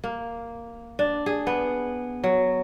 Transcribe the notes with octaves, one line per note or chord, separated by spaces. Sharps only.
A#3
D4
G#4
B3
F#3